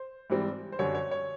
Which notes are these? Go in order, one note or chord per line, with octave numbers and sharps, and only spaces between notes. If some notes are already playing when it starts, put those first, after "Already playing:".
Already playing: C5
G#2 E3 G3 C4
C5
F#2 D3 G3 C#5
C#5
C#5